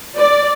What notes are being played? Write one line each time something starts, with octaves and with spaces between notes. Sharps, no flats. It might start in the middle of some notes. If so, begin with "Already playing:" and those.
D5